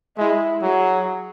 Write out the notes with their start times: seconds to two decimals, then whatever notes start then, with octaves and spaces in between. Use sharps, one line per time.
0.17 G#3 E4
0.62 F#3 G#4